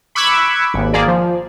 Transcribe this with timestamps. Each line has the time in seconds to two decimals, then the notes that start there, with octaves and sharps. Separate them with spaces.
0.15 B5 C#6 D6 E6 F#6 G#6
0.74 G#1 D#2
0.93 G#1 A#3 G#4 D5
1.08 F3